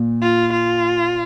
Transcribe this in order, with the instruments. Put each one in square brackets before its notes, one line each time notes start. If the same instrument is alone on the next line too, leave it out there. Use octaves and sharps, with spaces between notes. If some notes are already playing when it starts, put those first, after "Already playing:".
Already playing: [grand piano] A#2
[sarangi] F4
F4